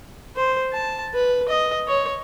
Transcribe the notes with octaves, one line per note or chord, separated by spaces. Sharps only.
C5
A5
B4
D#5
C#5